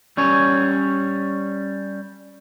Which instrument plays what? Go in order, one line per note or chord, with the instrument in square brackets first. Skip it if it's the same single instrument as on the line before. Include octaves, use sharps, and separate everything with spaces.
[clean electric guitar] G3 C#4 C#5